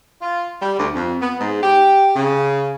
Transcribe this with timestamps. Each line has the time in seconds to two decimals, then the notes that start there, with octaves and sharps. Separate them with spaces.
0.22 F4
0.62 G3
0.79 D2
0.95 F2
1.22 B3
1.40 G#2
1.63 G4
2.16 C#3